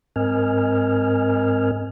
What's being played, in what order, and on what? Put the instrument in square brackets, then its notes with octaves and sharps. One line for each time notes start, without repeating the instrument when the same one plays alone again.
[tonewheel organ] G#2 C4 A#4 D#5 G#5 F6